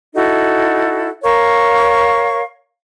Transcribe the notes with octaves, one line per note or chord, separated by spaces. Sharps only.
D#4 E4 F#4 A4
A#4 C#5 F5 C#6